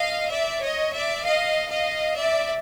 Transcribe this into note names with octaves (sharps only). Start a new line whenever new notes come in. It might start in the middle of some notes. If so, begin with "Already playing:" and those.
Already playing: D#5 F5
D5 E5
C#5 D#5
D5 E5
D#5 F5
D#5 F5
D5 E5